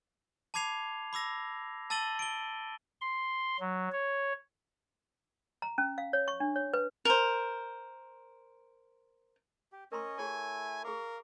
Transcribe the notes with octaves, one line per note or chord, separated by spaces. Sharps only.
A5 B5 D6 G#6 C7 F7
B5 D6 E6 A#6
A5 E6 A6 D#7 F#7 G7
D7 G7
C6
F#3
C#5
A#5
C#4
F5
C#5
C#6
D4
C#5
B4
A#4 C5
G4
C#4 A#4 C#5 D#5 A#5 C6
A3 E4 G4 G#4 C#5 G#5
G#4 A#4 F5 D6